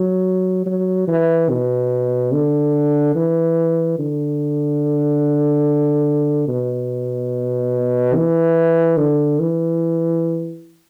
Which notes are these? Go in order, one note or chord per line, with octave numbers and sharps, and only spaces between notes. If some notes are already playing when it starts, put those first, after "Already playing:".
Already playing: F#3
F#3
E3
B2
D3
E3
D3
B2
E3
D3
E3